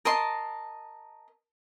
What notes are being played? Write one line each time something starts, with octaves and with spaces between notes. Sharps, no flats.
A#4 D#5 A5 C6